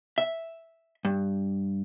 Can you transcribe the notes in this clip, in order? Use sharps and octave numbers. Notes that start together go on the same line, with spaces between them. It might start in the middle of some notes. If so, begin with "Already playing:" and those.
E5
G2